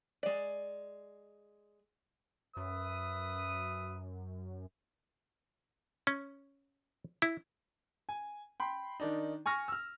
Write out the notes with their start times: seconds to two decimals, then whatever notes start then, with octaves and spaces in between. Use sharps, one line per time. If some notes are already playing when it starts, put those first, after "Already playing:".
0.23 G#3 D5
2.57 F#2 B4 E5 D#6
6.07 C#4
7.22 E4
8.09 G#5
8.60 G5 B5 C6
9.00 D#3 D4 D#4
9.46 G#5 C#6 F6 A#6
9.68 E6 F6